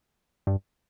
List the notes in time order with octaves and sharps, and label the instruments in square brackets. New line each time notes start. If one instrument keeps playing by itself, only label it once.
[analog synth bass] G2